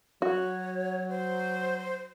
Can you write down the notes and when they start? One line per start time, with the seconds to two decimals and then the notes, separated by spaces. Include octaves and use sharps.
0.22 F#3 F#4 C#5
1.09 C5